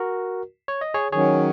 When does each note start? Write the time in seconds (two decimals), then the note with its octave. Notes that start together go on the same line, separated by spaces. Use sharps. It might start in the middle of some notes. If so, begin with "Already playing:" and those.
Already playing: F#4 A#4
0.68 C#5
0.81 D#5
0.94 G#4 C#5
1.12 D#3 F#3 C#4 G#4 C#5